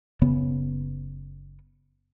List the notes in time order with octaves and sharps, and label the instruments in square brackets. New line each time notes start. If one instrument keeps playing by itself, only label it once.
[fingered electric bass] F#1 C#3 B3